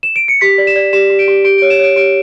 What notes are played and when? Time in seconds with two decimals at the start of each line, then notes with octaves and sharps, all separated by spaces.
0.03 E7
0.16 D7
0.28 C#7
0.41 G4 B6
0.58 D5
0.67 E7
0.76 D5
0.93 G4 E7
1.10 G4
1.19 D7
1.28 G4
1.44 G4 D7
1.58 C#5 D7
1.70 E7
1.79 C#5 D7
1.96 G4 D7